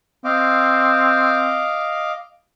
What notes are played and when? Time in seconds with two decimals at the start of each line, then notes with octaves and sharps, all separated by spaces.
0.24 C4 D#5 F5 D6